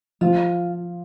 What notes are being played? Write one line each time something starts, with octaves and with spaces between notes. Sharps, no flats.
F3 F4